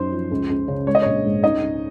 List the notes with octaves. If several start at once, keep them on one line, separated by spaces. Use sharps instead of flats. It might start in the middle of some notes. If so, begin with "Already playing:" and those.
Already playing: F#2 D#4 C5 C6
F3
C#2
C#2
C#3
G#3 C#5
D#5
A#1 C#5
G#2
C#2 D#4 D#5
C#2